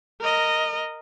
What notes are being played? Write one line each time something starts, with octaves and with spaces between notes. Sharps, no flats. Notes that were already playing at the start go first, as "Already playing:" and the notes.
A#4 D#5